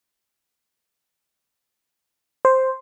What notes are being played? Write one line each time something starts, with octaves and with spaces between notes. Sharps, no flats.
C5